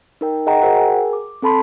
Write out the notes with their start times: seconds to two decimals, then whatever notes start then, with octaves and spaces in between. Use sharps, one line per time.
0.21 D#4 A#4 G5
0.46 G#4 D#5 F#5 G5 A#5
0.62 F#4 G#4 A#4 C5 F#5 G5
0.77 G#4 A#4 G#5
1.13 D6
1.42 C4 A4 A5 B5 C6 B6